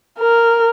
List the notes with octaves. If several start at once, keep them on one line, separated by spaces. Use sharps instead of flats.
A#4